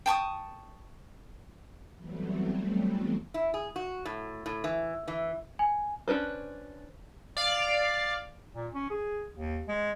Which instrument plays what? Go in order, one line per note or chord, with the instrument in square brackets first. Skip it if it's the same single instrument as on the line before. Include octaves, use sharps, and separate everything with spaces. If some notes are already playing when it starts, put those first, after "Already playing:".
[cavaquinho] G5 A5 C#6 D#6
[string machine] E3 F#3 G3 A3 B3 C4
[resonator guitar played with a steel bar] E4
G#4
F#4
A2
A2
E3
E3
[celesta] G#5
[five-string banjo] C#4 D4 B4 C5
[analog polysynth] D5 F5
[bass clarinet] A#2
C#4
G#4
D#2
G#3